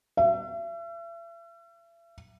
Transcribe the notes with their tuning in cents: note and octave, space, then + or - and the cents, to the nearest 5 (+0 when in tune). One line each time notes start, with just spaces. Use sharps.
E5 +40